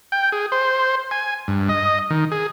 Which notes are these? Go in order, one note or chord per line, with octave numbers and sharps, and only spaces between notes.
G5
G#4
C5
G#5
G2
D#5
D#3
G#4